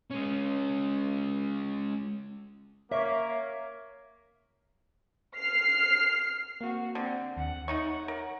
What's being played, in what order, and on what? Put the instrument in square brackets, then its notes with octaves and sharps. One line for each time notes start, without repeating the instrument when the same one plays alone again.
[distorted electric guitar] G#3 C#4
[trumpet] A#3 [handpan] C#5 [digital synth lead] E5
[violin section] F6 C7
[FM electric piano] A#3 [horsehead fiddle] C4 F#4
[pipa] D3 [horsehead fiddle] C4
[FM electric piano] D#2 [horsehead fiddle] F#5
[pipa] A3 D#4 C#6 [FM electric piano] C#5
[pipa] A#4